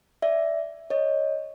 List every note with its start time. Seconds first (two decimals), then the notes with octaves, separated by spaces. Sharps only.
0.22 D5 E5
0.90 C#5 D#5